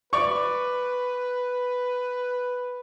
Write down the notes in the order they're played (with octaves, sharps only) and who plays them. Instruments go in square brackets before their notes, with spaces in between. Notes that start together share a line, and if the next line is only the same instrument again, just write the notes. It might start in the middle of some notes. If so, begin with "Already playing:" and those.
[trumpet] B4 [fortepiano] D5 C#6